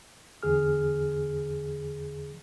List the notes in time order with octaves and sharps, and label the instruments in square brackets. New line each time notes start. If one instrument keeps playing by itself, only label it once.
[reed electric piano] E2 D3 G#4 F6